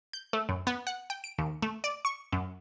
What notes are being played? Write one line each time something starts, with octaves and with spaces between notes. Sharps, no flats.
G6
A3
F#2
B3
F#5
G5
D7
D#2
A3
D5
C#6
F#2